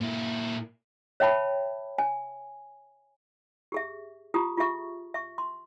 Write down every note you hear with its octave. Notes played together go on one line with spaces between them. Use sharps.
A#2 E4
C#5 E5 G5 A5 B5
G#5
G4 G#4 E5
F4 G4 A#5 D#6
F4 G4 G#4 E5 C#6
E5 C#6
C6